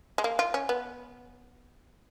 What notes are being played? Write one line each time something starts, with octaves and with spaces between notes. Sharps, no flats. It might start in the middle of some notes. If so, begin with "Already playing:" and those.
G#3
A#3
F4
C#4
B3